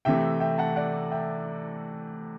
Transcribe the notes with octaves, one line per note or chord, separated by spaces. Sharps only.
C3 E3 A3 E5 G5
E5 G5
F#5 A5
D5 F#5
E5 G5